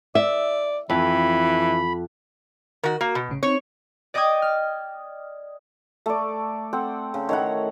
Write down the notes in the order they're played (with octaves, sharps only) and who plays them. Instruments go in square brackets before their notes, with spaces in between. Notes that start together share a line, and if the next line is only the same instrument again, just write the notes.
[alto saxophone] D5 [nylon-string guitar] E5
[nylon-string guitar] F2 [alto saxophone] E3 [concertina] B5
[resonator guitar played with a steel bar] D#3 F#4 [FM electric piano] A#4
[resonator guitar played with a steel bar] A#3 [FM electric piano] F#4
[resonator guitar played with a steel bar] B2
[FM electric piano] A1 C#3
[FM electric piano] C4 D#4 [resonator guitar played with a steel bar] C#5
[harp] D5 D#5 G5 D6 D#6 G#6
F6
[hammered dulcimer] A3 [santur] A4 D5
[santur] C4 A4 F#5
[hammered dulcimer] C#3
[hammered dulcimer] D#3 A3 E4 [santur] C#5 F#5